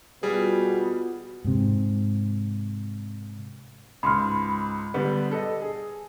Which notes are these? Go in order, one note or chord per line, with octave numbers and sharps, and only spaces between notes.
B2 G3 B3 F4 F#4 G#4
G#2 C3
C#2 G#2 B5 C6 F6
D3 G3 B3
A4 D#5
G#4